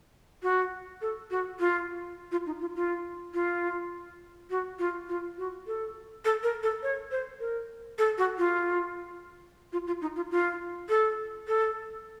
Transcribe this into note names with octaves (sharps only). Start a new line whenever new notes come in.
F#4
A4
F#4
F4
F4
D#4
F4
F4
F4
F#4
F4
F4
F#4
A4
A4
A#4
A4
C#5
C5
A#4
A4
F#4
F4
F4
F4
D#4
F4
F4
A4
A4